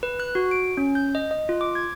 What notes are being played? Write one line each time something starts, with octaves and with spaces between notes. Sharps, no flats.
B4
F#6
F#4
D7
C#4
G6
D#5
D#5
F4
D6
G#6